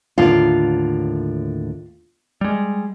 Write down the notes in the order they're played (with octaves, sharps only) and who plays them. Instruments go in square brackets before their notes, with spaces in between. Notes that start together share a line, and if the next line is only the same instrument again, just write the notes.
[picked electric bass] D#2 A2 D3 [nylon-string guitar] F4
[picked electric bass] G3 G#3